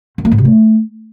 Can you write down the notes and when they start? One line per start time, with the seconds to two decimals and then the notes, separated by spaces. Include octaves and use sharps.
0.18 D#3
0.25 A#3
0.32 G#2
0.38 C3
0.45 A3